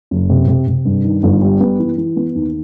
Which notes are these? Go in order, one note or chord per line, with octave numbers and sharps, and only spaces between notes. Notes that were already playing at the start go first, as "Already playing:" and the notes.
F#1
C3
C3
C3
G2
D#3
G1
G3
B3
E3
E3
B3
D#2